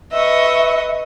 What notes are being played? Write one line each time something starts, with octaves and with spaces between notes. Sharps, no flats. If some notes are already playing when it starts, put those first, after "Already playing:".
B4 D#5 E5 C#6